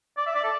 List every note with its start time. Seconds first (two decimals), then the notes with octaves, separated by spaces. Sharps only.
0.18 D5
0.27 E5
0.35 D5
0.44 A4